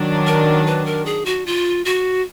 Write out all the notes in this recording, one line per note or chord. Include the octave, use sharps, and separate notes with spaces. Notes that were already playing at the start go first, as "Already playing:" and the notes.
Already playing: D#3 F#3 D4
A#4
B4
A#4
G#4
F#4
F4
F#4